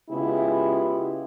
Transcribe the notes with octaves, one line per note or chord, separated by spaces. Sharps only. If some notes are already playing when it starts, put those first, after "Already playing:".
C#3 G#3 B3 E4 F4 G4